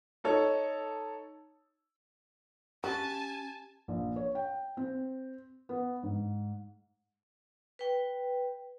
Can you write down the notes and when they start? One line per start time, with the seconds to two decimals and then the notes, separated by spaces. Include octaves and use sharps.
0.24 D#4 A4 C#5
2.84 C#4 F#4 G4 G#5 A5
3.88 A#1
4.16 C#5
4.35 G5
4.77 C4
5.69 B3
6.03 G#2
7.79 B4 G5